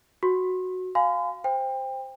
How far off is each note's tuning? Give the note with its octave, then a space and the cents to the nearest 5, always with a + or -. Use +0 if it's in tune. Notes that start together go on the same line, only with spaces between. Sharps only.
F#4 +0 C#6 -45
F5 +0 G#5 +0 C6 -45
C5 +0 G5 +25